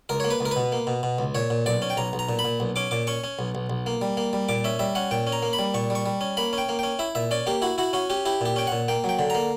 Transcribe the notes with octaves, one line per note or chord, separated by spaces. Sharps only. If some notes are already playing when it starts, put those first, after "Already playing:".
C#2 A#4
A#3 C#5
B4
C#2 A#4
B4
B2
A#3
B2
B2
C#2
A#2 C#5
A#2
B1 D5
C#4
G5
B1 A#5
B1
A#5
A#2
B5
A#2
B1
C#4 D6
A#2 D6
C#4 C#6
C#4
B1
B1
B1
A#3
G3
A#3
G3
A#2 D6
C#4 E5
G3 E5
C#4 F#5
A#2 G5
C#4
A#5
A#3
B5
G3
A#2 C#6
G3
C#6
G3
C#4
A#3 B5
C#4
G5
A#3
C#4 G5
E4 E5
A#2 E5
C#4 D5
A#3 G4
E4 F#4
E4 F#4
C#4 F#4
C#4 G4
E4 G4
A#2 G4
C#4 G5
A#2 F#5
A#3 G5
F#3
G5
D3
A#3 A#5